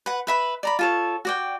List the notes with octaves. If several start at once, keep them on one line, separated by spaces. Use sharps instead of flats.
B4 F#5
B4 E5 B5
D5 A#5 B5
F4 A4 C#5
F#4 D5 G5